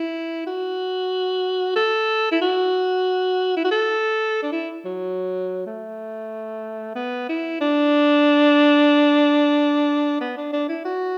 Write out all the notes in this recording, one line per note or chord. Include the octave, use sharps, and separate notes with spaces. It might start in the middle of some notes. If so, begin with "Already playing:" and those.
Already playing: E4
F#4
A4
E4
F#4
E4
F#4
A4
D4
E4
F#3
A3
B3
E4
D4
B3
D4
D4
E4
F#4